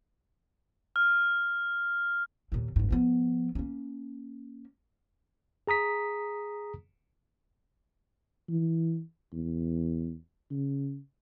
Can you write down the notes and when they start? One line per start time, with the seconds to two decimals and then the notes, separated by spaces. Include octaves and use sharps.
0.96 F6
2.52 D#2 A#2
2.76 F#1 G#2
2.90 F3 B3
3.55 A#3 C#4
5.67 G#4 A#5 D#6 B6
8.49 E3
9.33 E2
10.50 C#3